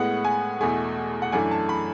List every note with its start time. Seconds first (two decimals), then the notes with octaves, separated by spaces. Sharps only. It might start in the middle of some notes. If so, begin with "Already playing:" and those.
Already playing: A2 G#3 B3 F#5
0.25 G#5
0.61 E2 B2 A3 G#5
1.22 F#5
1.32 F#2 E3 A3 D4 G#5
1.51 A5
1.69 B5